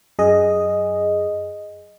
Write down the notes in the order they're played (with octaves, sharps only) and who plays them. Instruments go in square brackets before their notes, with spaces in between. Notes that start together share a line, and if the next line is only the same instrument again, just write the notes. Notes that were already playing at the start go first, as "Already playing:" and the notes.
[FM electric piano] F#2 G#4 D#5